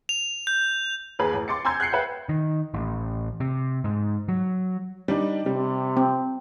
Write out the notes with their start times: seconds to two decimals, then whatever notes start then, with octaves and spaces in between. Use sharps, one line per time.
0.09 F7
0.47 G6
1.19 D#2 G#4 B4 A#5
1.34 A1
1.48 C6 D6 A6 C#7
1.65 G#5 A#5 C6 E6 G6 G#6
1.80 F#6 G6 C7 C#7
1.92 B4 E5 F#5 G5
2.29 D#3
2.74 A1
3.40 C3
3.84 G#2
4.28 F#3
5.08 G3 D4 D#4
5.46 C3 G3
5.97 C4